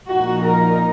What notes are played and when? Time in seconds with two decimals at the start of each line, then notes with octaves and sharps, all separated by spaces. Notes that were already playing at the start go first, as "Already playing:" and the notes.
0.08 A#2 F3 A#3 D#4 F#4
0.43 A#4